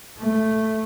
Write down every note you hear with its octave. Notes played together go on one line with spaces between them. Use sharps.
A3